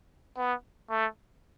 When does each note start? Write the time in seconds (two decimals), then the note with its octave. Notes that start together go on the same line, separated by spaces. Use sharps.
0.38 B3
0.90 A3